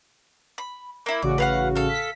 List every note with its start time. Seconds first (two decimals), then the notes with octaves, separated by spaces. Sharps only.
0.58 B5
1.06 A#3 E4
1.22 A1 C#3 F#4 D5
1.38 B4 F5 F#5
1.75 A4 F5
1.89 B6